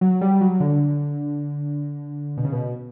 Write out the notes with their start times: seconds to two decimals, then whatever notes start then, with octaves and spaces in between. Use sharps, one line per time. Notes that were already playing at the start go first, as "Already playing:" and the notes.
0.01 F#3
0.21 G3
0.41 F#3
0.60 D3
2.37 B2
2.45 C#3
2.52 B2